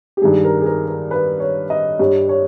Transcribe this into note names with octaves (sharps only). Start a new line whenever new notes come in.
G4
G2 D#3 G3 G#4
A#4
G#4
A#4
A#4
B4
C#5
D#5
G2 G3 C#5
C#5